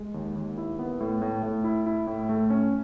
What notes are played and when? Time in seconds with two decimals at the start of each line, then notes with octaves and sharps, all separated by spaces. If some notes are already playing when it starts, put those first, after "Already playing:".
Already playing: G#3
0.14 D#2
0.35 D#2
0.58 E4
0.79 B3
1.00 A2
1.22 A2
1.43 A2
1.64 E4
1.86 E4
2.07 A2
2.29 A3
2.50 C#4